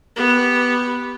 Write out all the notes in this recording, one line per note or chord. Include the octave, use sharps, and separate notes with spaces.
B3 G4